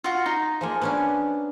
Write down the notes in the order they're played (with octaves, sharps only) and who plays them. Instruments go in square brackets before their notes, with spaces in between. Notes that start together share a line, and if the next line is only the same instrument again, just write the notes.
[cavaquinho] F4 F#4
D#4
[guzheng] F3 G#3 A#3
B3 C#4 D4